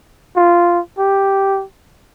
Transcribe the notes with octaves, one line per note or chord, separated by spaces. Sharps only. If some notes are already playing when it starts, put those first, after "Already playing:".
F4
G4